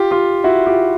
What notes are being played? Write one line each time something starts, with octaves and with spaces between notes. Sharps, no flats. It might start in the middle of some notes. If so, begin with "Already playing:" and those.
Already playing: F4 G4
F4 G4
E4 F#4
F4 G4